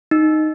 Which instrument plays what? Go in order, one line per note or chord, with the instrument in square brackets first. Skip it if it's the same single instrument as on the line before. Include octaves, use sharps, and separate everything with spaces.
[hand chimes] D#4